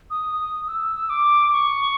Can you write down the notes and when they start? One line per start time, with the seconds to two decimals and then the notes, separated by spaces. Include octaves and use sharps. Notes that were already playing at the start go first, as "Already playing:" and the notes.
0.10 D#6
0.68 E6
0.95 E6
1.09 D6
1.53 C#6